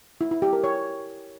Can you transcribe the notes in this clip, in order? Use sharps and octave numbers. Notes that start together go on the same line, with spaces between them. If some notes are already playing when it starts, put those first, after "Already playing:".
E4
E4
G4
A#4
C#5